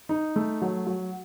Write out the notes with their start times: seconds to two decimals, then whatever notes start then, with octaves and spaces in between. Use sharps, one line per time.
0.09 D#4
0.36 A3
0.62 F#3
0.87 F#3